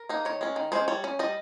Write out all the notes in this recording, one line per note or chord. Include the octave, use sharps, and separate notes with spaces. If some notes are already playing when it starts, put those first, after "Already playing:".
Already playing: A#4
A#3 D#4
D#3 C#5
G#3 C#4
D#3
G#3 C#4 C5
G3 C#5
C#4
G3 D#5